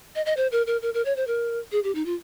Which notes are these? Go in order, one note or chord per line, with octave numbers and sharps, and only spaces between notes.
D#5
D#5
C5
A#4
A#4
A#4
A#4
C#5
C5
A#4
G#4
G4
D#4
F4